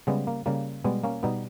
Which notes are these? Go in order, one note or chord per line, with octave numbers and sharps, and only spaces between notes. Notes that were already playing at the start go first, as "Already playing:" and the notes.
C#3 G3 G#3 B3
A#3
C#3 G3 A#3
B2 G3 G#3 B3
A#3 C#4
B2 G3 B3 D#4